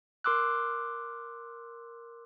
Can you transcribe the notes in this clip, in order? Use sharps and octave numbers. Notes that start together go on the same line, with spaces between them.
A#4 C6 D6 E6 F#6